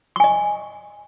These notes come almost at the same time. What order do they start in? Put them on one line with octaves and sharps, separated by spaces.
C#6 G#5 D#5